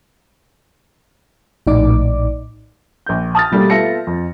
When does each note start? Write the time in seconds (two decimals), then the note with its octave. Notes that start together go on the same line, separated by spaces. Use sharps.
1.67 A#1 A2 D#4 D5 D6
3.06 A#1 G6
3.35 A5 D#6 F6 A6
3.51 B2 G3 A3 A#3 D4
3.70 B3 F4 A4 E5 A#6 C#7
4.07 F2